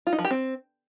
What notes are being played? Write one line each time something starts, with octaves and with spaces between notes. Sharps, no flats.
F4
D#4
F3
G4
C4